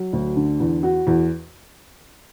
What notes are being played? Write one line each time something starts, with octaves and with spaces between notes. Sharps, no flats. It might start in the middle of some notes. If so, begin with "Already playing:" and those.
Already playing: F#3
D2
D3
E2
F#4
E2